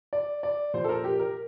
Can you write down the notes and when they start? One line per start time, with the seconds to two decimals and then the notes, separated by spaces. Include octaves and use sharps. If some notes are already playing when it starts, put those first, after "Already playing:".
0.13 D5
0.43 D5
0.74 A#2 F3 C5
0.84 A4
0.89 A#4
1.04 G4
1.19 A#4